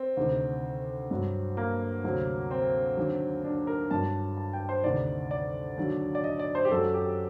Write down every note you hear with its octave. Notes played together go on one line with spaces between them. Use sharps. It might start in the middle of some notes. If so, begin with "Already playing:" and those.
Already playing: C4
D2 C3 D#3
G2 F#3
A#3
D2 C3 F#3
C4
D#2 D3 F#3
D4
A#4
G2 F#3 A5
A5
G5
C5
D2 C3 D#3 D5
D5
D#2 D3 F#3
D5
D#5
D5
C5
G4
F#2 F#3 A4
G4